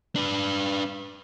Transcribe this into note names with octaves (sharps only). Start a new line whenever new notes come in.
D4 B4